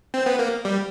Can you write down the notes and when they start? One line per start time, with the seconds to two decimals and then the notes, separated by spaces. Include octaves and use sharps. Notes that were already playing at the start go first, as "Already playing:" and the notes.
0.14 C4
0.26 B3
0.39 A#3
0.65 G3